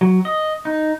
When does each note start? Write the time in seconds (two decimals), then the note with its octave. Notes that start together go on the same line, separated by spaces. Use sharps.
0.01 F#3
0.25 D#5
0.65 D#4